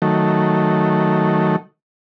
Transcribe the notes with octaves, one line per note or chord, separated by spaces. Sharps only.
D#3 F#3 A3